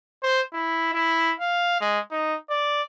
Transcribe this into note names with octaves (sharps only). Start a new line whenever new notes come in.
C5
E4
E4
F5
G#3
D#4
D5